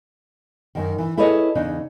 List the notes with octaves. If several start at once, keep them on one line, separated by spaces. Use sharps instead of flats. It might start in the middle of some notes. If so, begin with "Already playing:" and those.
F#2 D#3
E3
E4 G#4 A4 B4 C#5 D#5
E2 C#3 D4 D#4